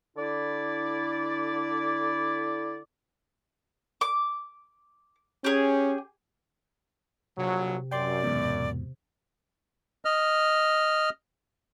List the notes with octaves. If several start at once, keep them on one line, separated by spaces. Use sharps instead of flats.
D3 E4 D5
D6
C#4 G4 G#4
A#1 C3 F#3
F#2 D5 G5 C6 D6
E2 G#2 B2
D#5 F6